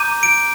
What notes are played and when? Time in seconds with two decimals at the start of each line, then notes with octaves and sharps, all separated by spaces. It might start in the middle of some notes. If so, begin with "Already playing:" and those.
Already playing: A#5 D6 G6 D#7
0.23 D7